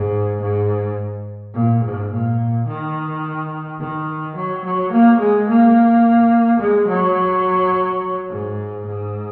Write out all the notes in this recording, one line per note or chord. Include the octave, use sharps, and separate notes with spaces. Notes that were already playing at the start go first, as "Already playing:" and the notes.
Already playing: G#2
G#2
A#2
G#2
A#2
D#3
D#3
F#3
F#3
A#3
G#3
A#3
G#3
F#3
G#2
G#2